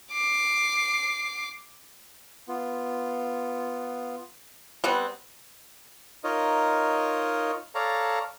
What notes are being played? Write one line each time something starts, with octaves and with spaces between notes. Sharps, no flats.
D6 C7
B3 F4
G3 B3 C4 F#6
D#4 F4 A#4 C#5 D#5
A4 C#5 D5 F5 A#5